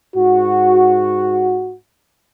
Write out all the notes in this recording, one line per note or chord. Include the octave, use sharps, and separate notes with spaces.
G#2 F#4